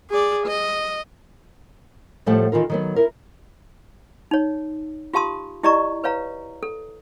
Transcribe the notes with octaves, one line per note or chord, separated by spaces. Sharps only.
G#4 D5
D#5
A2 F3 G3 A3 A4 F#5
D#3 E3 F4 A#4
D#3 F#3 B3
E4 A#4
D#4 C#5
F4 G4 F5 A5 C6 D#6
E4 G4 D5 D#5 A#5 C#6
B4 C#5 F5 A#5
A4